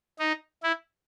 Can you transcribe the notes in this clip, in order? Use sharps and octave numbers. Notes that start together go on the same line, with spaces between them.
D#4
E4